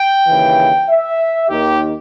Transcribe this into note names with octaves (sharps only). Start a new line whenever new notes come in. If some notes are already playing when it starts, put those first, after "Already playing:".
Already playing: G5
D#2 C#3 E3
E5
D#2 D#3 G4